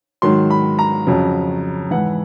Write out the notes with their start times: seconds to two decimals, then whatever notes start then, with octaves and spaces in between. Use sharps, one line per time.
0.22 G#2 D#3 F#3 C6
0.50 B5
0.79 A#5
1.07 F2 C#3 F#3
1.91 G#2 E3 F#5